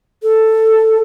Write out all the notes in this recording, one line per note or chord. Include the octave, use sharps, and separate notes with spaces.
A4